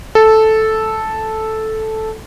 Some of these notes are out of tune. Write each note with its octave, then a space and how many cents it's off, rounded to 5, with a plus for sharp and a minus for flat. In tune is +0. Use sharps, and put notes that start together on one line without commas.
A4 -5